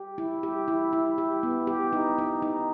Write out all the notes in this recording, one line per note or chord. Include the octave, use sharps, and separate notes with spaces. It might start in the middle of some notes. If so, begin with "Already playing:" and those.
Already playing: G4
E4
G4
E4
E4
G4
B3
G4
D#4
D#4
D#4